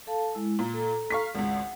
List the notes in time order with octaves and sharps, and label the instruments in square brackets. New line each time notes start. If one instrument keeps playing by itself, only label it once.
[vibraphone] A4 F5 A5
G#3 E4
[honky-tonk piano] A#2 [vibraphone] A#5
[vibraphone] A4 A#5
[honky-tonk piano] F5 C#6 B6
[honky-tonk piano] G#1 C#2 [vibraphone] F#5